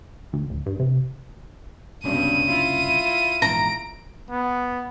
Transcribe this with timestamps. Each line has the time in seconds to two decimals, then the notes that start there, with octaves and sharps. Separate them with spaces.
0.33 D2
0.50 D1
0.66 G2
0.80 C3
2.04 F#1 C2 G2 B2 C#4 D#7
2.49 E4 F4
3.42 A#1 E2 G#2 A#5 D7
4.30 B3